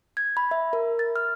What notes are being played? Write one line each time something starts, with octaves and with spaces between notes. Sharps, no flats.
G#6
B5
E5
A#4
A6
F6